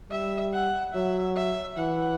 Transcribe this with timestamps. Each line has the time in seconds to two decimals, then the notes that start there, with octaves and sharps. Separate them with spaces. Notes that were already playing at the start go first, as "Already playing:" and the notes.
0.11 G3 E5
0.53 F#5
0.94 F#3 E5
1.36 E5
1.78 E3 F#5